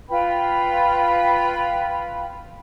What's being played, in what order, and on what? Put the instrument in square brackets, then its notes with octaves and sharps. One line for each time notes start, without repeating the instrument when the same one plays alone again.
[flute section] F4 B4 G5 B5